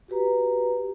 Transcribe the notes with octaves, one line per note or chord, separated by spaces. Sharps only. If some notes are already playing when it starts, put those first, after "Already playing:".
F#4 G4 B4 A#5